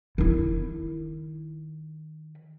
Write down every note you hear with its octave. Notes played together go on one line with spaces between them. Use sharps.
D#3 E4